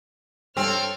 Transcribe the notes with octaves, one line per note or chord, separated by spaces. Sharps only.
G2 C4 A4 C#5 F6